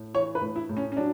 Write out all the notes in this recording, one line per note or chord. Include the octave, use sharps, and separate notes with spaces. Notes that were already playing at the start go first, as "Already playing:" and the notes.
Already playing: A2
E3 C#5
B4
A2
E4
A2
C#4
C#4
F#3 D4